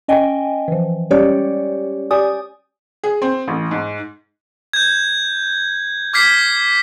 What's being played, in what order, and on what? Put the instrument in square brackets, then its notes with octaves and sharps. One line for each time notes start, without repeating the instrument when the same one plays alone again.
[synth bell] C#4 D#5 G5 G#5
E3 F3
G3 G#3 C#4 G4 C#5 D5
G4 D5 G#5 D#6
[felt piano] G#4
C4
A1
G#2
[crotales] G6 G#6
D6 F6 G#6 B6 C7